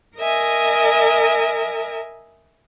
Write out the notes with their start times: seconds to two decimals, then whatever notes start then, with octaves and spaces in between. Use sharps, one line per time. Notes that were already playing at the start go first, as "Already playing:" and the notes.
0.17 A#4 D#5 E5 G#5